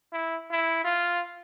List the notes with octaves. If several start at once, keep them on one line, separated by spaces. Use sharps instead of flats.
E4
E4
F4